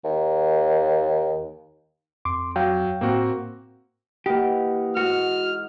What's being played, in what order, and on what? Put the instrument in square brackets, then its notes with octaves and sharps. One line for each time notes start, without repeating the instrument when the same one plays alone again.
[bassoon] D#2
[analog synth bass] F2 [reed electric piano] C6 D6
[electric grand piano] F#3 [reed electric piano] F5 G5
[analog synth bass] A2 [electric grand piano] A#3 C4 F#4
[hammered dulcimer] E3 D#5 F#5 [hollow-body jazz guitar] A#3 G4
[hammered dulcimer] G#2 [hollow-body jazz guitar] F#4 [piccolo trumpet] F6